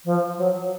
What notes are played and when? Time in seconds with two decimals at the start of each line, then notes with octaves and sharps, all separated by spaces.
0.04 F3
0.37 F#3